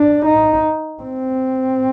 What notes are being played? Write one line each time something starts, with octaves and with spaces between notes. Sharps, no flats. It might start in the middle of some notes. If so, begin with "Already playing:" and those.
Already playing: D4
D#4
C4